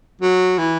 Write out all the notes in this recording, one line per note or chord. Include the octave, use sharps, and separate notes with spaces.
F#3
E3